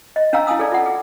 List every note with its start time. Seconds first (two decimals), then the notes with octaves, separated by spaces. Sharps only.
0.16 D#5
0.33 C#4 D4 F5 G#5 A#5 E6
0.47 E4 F5 G#5 A5 D#6 E6
0.59 G#4 A4 D5
0.72 F4 F#5
0.86 G#4